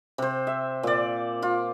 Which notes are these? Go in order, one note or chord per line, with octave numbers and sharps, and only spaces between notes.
C3 C5
E5
A#2 D5
F4